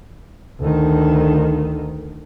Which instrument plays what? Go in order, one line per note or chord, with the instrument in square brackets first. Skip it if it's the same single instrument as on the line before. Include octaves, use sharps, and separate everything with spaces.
[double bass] D2 D#3